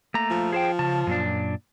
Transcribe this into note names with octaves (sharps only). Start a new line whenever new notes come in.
A3 A#3 A#5
F3
G#4 C5 G5
C#3 A5
F#2 A#2 D4